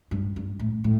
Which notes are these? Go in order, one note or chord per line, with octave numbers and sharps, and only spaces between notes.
G2
G2
A2
A2